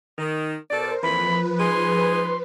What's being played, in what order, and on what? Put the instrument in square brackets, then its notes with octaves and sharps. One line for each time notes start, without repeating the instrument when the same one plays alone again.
[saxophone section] D#3
[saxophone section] B2 A4 D5 [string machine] A#4 C5
[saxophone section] F2 A#2 E3 [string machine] F3 B4 [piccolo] B5
[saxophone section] G#3 D#4 G#4 [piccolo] C6